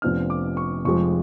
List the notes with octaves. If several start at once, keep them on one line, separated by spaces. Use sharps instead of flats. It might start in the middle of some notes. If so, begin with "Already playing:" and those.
F1 F2 F3 B3 D4 F6
D6
C#6
F1 F2 F3 G#3 C#6